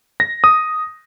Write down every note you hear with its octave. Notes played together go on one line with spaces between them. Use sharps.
A#6
D#6